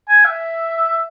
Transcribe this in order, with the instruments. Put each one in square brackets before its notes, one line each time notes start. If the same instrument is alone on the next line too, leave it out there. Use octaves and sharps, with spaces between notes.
[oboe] G#5
E5